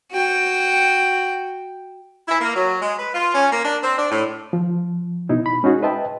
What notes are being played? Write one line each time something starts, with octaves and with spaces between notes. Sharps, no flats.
F#4 G5
E4
A#3
F#3
G#3
B4
F4
C#4
A#3
D4
C4
D4
A2
F3
B2 D#4 E4
B5
G#3 C#4 D#4 F#4 G#4
B4 C5 D#5 E5 G5 A5